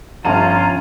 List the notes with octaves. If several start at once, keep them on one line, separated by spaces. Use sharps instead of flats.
G1 F3 C#4 F4 A5 A#5 D#7